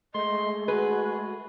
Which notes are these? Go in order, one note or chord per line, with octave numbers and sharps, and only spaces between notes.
G#3 A3 D#5 C6
F#4 G#4 B4